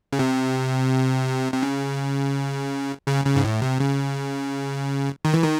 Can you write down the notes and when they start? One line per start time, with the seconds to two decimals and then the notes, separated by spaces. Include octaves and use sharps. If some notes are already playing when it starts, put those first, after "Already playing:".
0.13 C#3
0.19 C3
1.54 C3
1.63 C#3
3.08 C#3
3.25 C#3
3.36 G#2
3.44 A2
3.62 C3
3.80 C#3
5.25 D#3
5.34 E3
5.44 D#3